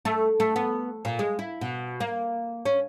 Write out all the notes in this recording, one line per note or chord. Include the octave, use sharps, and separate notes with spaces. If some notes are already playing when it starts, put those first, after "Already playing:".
A3
A3
B3
A#2
G#3
E4
B2
A#3
C#4